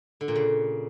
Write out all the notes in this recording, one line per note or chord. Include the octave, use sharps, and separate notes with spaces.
D3
A#2
C#3